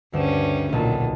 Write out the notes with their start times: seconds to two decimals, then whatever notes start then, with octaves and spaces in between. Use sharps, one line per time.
0.13 D2 G2 C#3 C#4 E7
0.72 B1 A#2 D#3 A5